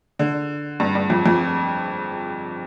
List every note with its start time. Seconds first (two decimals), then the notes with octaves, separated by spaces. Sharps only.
0.19 D3
0.80 G2
0.95 G2
1.10 F2
1.26 F2